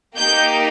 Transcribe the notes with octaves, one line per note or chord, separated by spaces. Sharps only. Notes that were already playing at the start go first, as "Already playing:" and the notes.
A#3 D#4 G4 G6